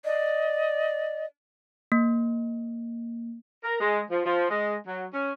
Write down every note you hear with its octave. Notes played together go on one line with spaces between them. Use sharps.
D5 D#5
A#3
A#4
G#3
F3
F3
G#3
F#3
C#4